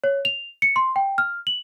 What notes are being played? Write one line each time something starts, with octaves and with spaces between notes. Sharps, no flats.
C#5
F7
C#7
C6
G5
F6
F#7